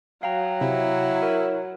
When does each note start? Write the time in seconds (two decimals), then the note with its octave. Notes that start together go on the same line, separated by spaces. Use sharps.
0.23 F#3 F5 G5 A#5
0.61 C3 E4
1.22 A#4 C#5